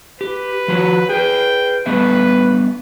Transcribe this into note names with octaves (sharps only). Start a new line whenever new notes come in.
G4 B4
F3 F#4
G#4 B4 G5
G3 B3 B4 E5